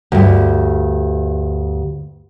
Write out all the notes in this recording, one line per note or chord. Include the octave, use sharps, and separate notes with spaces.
D2 G2